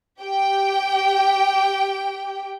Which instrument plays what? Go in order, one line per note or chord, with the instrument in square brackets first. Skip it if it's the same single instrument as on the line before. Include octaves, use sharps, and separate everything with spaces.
[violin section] G4 G5